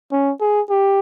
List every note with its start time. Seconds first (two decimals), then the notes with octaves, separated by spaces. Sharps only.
0.12 C#4
0.41 G#4
0.70 G4